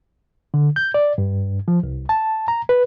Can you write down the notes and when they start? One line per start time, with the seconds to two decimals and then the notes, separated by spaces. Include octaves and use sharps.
0.54 D3
0.76 G6
0.94 D5
1.18 G2
1.68 F3
1.83 C2
2.09 A5
2.48 A#5
2.69 B4